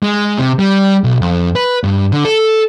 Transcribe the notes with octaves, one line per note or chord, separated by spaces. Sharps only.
G#3
C3
G3
B1
F2
B4
G2
D3
A4